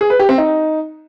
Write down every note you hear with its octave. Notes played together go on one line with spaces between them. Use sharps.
G#4
B4
G4
C4
D#4